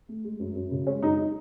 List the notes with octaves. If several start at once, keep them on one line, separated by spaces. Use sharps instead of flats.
A3
G#3
F#2
F#2
C#3
G#3 C#4
F#2 D#4
D#4